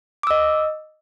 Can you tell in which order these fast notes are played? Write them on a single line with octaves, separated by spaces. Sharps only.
D6 E6 D#5